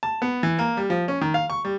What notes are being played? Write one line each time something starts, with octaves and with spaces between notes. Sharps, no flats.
A5
B3
E3
A#3
G3
F3
C#4
D#3
F5
C#6
G3